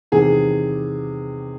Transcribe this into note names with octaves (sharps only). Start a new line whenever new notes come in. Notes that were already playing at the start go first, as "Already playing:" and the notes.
E2 C3 D#3 G#4